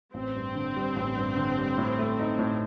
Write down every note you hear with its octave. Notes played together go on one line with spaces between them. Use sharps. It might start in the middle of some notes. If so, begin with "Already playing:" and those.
A1 C4
G2
D3
G3
A1
G2
D3
G3
A2
A3
D#4
A2